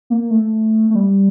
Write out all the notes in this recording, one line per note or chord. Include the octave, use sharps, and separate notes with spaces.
A#3
A3
A3
G3